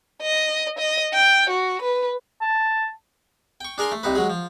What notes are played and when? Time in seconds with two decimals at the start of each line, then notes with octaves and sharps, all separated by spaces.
0.22 D#5
0.79 D#5
1.14 G5
1.50 F#4
1.82 B4
2.42 A5
3.61 G5 C#6
3.78 D4 G#4 A#4 G#5 C6
3.92 A3
4.03 C2 C3 D#4 B4
4.15 F#3 G#3 G#4
4.30 F3